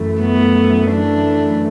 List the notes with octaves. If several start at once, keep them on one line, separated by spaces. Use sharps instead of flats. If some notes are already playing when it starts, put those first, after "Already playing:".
Already playing: F#2 E3 A3
B3
D4